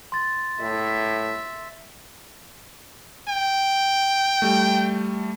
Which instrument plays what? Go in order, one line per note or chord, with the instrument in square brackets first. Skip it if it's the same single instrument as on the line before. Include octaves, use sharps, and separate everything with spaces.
[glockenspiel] C6 A6
[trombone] A2 [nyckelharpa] E5
[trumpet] G5
[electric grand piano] G3 A3